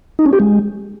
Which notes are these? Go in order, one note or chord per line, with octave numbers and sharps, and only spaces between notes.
D#4
C#4
G4
G#3